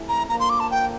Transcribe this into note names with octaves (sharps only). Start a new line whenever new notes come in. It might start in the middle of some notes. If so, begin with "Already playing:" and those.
Already playing: C3 E3 A3 E4
A#5
D3 F3 A#3 A#5
C6
D6
A5
G5